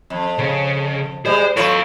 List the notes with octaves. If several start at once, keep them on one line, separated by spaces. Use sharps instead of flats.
F2
C#3
G3 G#3 C5
F4 A4 B4 C#5 F5